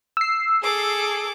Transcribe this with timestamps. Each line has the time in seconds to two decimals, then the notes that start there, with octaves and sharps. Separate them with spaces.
0.17 E6 C7
0.62 G#4 A4 D6